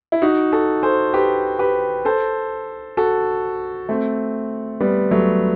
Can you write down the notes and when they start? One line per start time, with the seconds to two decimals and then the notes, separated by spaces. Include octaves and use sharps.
0.12 E4
0.22 D#4 F#4
0.53 F#4 A4
0.83 A4 C5
1.13 G4 B4
1.59 G4 B4
2.05 A4 C5
2.97 F#4 A4
3.89 A3 C4
4.81 G3 B3
5.11 F#3 A3